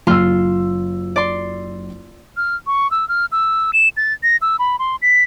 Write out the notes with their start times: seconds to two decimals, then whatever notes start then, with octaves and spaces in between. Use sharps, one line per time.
0.07 F#1 F4 C6 E6
1.16 D5 C6
2.37 F6
2.67 C#6
2.91 E6
3.09 F6
3.32 E6
3.73 E7
3.97 A6
4.23 A#6
4.42 E6
4.59 B5
4.79 C6
5.02 B6